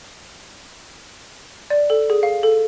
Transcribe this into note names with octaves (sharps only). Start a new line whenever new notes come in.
D5
A4
G#4
F5
A4